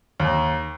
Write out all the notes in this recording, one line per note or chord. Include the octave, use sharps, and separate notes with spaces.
D#2